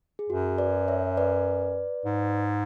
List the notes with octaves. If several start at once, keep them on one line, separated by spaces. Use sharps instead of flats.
G#4
F#2 F#4
B4 D5
C#5 E5
B4 D5
G#2